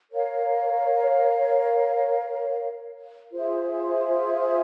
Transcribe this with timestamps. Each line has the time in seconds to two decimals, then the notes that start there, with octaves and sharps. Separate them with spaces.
0.10 A#4 C#5 F5
3.32 F4 G#4 C5 E5